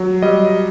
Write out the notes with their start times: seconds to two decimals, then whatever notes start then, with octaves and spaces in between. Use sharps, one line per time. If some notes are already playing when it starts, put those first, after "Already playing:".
Already playing: F#3
0.22 G3 D#5